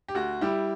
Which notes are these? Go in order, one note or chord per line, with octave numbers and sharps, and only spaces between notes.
G4
D2 F#4
G3 E4 G4